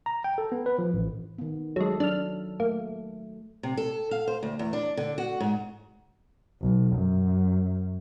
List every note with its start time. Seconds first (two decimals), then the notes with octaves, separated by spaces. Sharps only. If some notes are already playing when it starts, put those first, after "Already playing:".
0.06 A#5
0.24 G5
0.38 A4
0.52 B3
0.66 B4
0.78 F3
0.94 A1
1.38 D#3 B3
1.76 F#3 G#3 A4
2.00 F#3 D4 F6
2.60 A3 A#3
3.63 C3
3.77 A4
4.11 F5
4.28 C5
4.43 D2
4.59 E2
4.73 D4
4.97 D3
5.18 F#4
5.40 G#2
6.61 B1
6.96 F#2